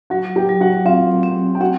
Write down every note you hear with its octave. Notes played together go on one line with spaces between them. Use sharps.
F#3 F#4 F#5
G4 G5
F#3
F#4 F#5
C4 F4 F5
C4
G5
C4 F#4 F#5